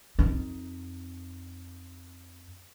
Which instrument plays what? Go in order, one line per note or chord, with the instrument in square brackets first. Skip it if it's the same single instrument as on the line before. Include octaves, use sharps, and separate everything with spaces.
[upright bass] F2 D#4